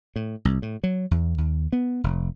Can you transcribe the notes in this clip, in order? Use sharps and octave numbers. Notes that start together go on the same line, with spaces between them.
A2
C2
A2
F#3
E2
D#2
B3
F1